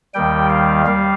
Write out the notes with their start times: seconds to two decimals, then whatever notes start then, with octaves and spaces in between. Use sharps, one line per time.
0.14 D#2 D#3 G3 G5
0.50 F5
0.86 G3 F5